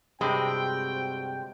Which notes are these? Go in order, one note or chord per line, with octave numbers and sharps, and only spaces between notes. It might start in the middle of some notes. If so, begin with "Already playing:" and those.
G2 C3 G#3 C4 F#4 G5